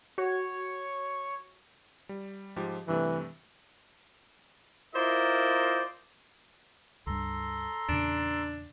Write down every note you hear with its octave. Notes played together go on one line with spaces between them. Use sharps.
F#4 C#5
G3
G#2 F3 G4
G2 C3 E3 A3
E4 F4 A#4 C5 D5 D#5
C#2 G2 A4 A#5 C6
E2 A#2 C#3 D4